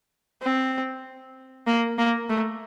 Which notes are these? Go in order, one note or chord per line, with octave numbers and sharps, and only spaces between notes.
C4
A#3
A#3
A3